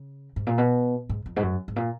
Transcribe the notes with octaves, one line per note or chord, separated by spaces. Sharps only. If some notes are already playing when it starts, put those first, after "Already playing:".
Already playing: C#3
G#2
A#2
B2
G#2
F2
G#2
F#2
G#2
A#2